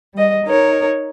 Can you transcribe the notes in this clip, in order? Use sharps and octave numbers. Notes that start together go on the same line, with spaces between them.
G3 D#5
D#4 A#4 C#5